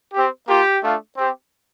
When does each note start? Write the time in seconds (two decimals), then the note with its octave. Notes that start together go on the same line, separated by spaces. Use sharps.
0.13 C4 G4
0.48 A#3 F4 G4
0.83 A3 D4 F4
1.16 C4 G4